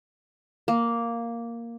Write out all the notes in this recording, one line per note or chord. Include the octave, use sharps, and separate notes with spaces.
A#3